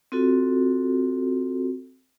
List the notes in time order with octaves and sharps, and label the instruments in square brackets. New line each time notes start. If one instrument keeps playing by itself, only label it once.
[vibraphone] C4 F4 F#4 A4